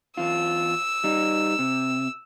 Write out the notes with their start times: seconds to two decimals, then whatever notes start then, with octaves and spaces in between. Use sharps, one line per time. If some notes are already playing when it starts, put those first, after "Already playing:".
0.17 E2 F4 E6
1.04 G3 D#4
1.59 C3